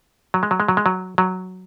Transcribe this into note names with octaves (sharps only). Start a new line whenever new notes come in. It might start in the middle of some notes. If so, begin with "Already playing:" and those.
F#3
G#3
F#3
G#3
F#3
G#3
F#3
F#3